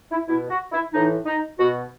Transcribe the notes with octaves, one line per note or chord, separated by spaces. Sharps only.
E4
B2 E4
F#4
E4
A2 E3 D#4
D#4
B2 F#4